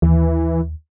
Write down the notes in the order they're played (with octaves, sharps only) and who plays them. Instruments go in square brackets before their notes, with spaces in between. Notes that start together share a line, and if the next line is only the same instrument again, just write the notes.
[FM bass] D#2 [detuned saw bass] E3